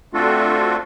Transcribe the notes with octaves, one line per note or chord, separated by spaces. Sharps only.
A3 C4 D4 F4 F#4 A4